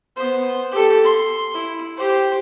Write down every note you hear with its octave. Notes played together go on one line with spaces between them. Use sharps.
B3 C5
G4 A4
C6
E4
G4 C5